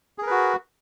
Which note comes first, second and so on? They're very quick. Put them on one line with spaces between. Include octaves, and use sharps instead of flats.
G#4 A#4 B4 F#4